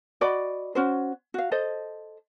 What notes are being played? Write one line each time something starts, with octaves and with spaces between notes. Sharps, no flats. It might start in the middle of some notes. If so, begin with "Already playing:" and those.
F#4 D5 D#5 B5
C#4 F#4 C5
F#4 F5
A4 C5 D#5